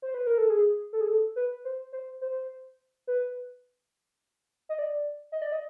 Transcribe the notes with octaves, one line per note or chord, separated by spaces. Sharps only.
C5
B4
A#4
A4
G#4
A4
G#4
A4
B4
C5
C5
C5
B4
D#5
D5
D#5
D5
D#5